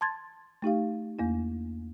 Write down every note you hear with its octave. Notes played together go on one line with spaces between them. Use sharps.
A5 C6 G#6 A6
A3 D#4 G4 F5
E2 A#3 E4